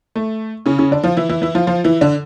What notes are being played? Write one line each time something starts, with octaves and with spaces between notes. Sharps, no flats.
A3
C#3 C#4
C#3 C#4
D3 D4
F3 F4
E3 E4
E3 E4
E3 E4
F3 F4
F3 F4
E3 E4
D3 D4